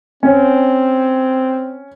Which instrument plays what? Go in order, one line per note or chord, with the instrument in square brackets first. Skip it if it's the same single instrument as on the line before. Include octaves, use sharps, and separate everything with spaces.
[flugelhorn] C4 [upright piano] C#4